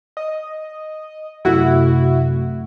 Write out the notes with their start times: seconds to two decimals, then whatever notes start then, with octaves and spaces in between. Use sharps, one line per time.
0.17 D#5
1.45 F#2 C3 A3 E4 F#4